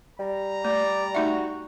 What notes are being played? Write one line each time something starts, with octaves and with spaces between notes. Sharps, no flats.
G3 A#5
A3 D5
A3 D#4 F#4 E5